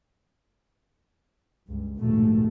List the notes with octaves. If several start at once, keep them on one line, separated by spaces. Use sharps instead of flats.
C#2 G2
A#1 D#2 G#2 B2 A3